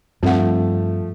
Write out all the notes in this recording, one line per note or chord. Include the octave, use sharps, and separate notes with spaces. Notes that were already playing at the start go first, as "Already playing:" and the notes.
G2 F3 A3 C4 F#5